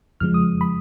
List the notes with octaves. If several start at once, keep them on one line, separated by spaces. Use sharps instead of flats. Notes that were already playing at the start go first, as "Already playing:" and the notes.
F2 C#3 F3 G#3 F6
D#6
B5